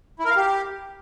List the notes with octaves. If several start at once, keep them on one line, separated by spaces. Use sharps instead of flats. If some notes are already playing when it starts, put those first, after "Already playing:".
E4
A#4
F5
G4